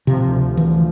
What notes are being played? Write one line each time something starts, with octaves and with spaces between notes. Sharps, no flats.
C3 F3
D2
D2
E3
D2